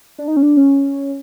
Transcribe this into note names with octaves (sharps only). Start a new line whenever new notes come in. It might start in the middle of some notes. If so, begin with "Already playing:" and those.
D4
D#4
C#4
D4
C#4